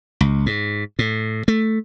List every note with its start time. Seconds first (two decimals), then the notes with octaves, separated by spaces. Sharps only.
0.21 C#2
0.46 G#2
0.99 A2
1.48 A3